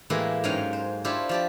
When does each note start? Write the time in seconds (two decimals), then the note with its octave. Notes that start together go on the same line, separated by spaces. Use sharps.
0.10 A2 E3 G#3 A#3 E4 G4
0.44 G#2 F#3 G#3 C#4 F5 G5
0.73 C5
1.04 D4 E4 F4 G4 C5 C#5
1.29 F3 G4 D5